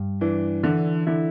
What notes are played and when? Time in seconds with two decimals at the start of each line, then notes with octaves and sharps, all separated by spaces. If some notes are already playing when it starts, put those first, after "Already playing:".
Already playing: G2
0.21 E3 D4
0.63 D3 E3
1.07 D3 E4